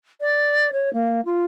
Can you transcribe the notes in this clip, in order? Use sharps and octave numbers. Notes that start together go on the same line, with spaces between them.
D5
C#5
A#3
F4